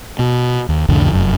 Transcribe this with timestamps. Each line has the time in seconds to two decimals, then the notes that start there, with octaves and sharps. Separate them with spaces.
0.19 B2
0.69 D#2
0.89 C2 F2 A2 D3
1.12 F1 F#2